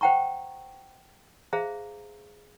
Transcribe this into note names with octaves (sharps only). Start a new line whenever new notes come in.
C5 F#5 G5 A#5 C#6
G#4 C5 E5 F5 A#5